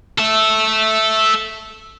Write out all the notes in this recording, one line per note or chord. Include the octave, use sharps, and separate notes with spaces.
A4 E5